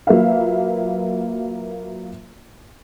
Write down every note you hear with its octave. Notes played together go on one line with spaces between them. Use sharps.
F#3 A#3 F4 B4 E5 F5